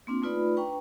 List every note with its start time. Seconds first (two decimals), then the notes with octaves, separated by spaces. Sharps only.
0.07 A#3 C4 D4 F4
0.22 A3 D#4 F4 B4 D5 B5
0.57 D4 B4 G5 A#5 C#6